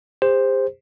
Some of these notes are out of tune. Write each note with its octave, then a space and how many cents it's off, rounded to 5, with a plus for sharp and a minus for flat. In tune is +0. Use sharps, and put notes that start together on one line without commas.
G4 +45 C5 +0